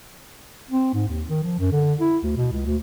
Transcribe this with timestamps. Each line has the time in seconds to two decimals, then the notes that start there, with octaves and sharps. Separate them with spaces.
0.71 C4
0.93 G#2
1.08 D#2
1.29 D#3
1.43 F3
1.59 F#2
1.72 D3
2.00 E4
2.23 D2
2.36 B2
2.52 C#2
2.65 D2